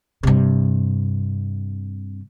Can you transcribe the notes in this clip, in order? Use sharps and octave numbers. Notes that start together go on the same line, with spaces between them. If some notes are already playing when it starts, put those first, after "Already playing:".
G2 C3